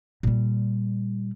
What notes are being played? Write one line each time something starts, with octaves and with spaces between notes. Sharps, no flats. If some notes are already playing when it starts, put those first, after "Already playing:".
A#2 G3